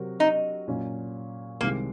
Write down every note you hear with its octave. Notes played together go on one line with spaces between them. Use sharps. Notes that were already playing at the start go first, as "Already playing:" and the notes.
Already playing: C3 F#3 C4 F#4 A#4
D#4
A#2 F#3 C#4
C2 C3 D#3 G#3 A#3